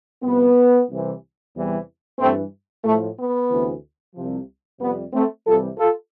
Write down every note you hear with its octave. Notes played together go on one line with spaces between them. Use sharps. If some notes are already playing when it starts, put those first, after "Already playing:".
C2 C3 F3 B3
C2 C3 E3
E2 C3 E3 G3
G2 E3 G3 A3 C4
A2 F3 A3
B3
D2 C3 E3
C2 C3 F3
F2 C3 G3 B3
A3 C4
C2 C3 E3 G3 F4 A4
F4 A4